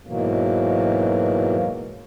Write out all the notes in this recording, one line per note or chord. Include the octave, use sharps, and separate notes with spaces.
G#2 B2 E3 F#3 A#3